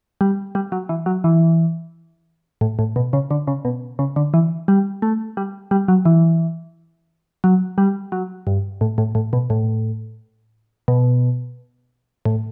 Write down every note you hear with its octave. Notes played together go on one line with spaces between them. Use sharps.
G3
G3
F#3
E3
F#3
E3
A2
A2
B2
C#3
D3
C#3
B2
C#3
D3
E3
G3
A3
G3
G3
F#3
E3
F#3
G3
F#3
G2
A2
A2
A2
B2
A2
B2
A2